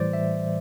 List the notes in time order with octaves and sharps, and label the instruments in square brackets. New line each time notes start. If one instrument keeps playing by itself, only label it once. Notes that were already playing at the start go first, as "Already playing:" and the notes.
Already playing: [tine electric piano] A2 E3 G3 C5 D5
E5